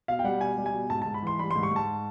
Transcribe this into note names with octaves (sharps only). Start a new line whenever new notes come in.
B2 F5
G5
G3 F#5
B2 G#5
G3
G#5
B2
G#2 A5
G#2 A5
B5
E3 C6
G3 B5
C6
G#2
C#6
G#2 A5